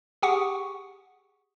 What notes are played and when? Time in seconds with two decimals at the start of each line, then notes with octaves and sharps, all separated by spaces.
0.22 G4 G#4 F#5 C#6 D#6